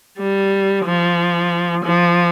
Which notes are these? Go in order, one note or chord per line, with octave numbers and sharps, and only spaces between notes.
G3
F3
F3